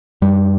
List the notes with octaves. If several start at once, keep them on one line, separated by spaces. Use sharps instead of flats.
F#2 G3